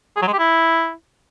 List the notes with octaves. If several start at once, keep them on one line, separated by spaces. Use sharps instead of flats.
G#4
F#3
G#3
G4
E4